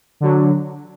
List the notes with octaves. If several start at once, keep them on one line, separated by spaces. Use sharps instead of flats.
D3 F#3